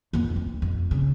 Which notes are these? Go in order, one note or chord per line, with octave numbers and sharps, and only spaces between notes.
F2 B3
D2
F2
C#3